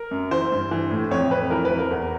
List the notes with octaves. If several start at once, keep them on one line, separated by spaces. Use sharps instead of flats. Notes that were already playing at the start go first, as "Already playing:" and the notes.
Already playing: A#4
F#2
E3 C5
G2
E3
A2
F2 C#5
F2 B4
E3 A#4
B4
E3
A#4
E2